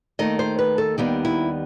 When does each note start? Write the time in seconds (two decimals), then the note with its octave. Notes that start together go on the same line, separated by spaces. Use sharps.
0.19 D#2 D#3 A3 D#5
0.39 C5
0.59 B4
0.78 A4
0.98 D#2 D#3 G3 B3 G4
1.25 E4